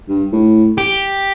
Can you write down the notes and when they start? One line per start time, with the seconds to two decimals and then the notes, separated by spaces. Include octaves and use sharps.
0.09 G2
0.33 A2
0.78 G4